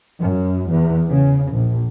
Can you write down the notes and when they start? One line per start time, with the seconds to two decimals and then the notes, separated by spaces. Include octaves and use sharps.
0.19 F#2
0.70 E2
1.08 C#3
1.50 A#1